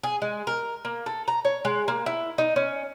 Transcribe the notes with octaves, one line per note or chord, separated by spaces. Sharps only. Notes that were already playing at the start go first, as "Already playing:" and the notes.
G#4
G#3
A#4
A#3
A4
A#5
C#5
G#3
A#3
E4
D#4
C#4